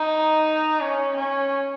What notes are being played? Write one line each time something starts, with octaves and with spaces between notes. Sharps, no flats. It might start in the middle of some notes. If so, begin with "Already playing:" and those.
Already playing: D#4
C#4
C#4